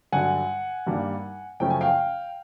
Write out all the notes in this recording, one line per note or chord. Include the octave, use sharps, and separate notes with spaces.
G2 D3 F#3 F#5 G#5
G2 D#3 G3 A#3 D4
F#2 C#3 F3 A3 C#4 G5
G#5
F5 G5